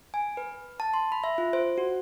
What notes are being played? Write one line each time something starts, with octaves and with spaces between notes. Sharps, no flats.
G#5
B4
A5
C6
B5
E5
F4
C5
F#4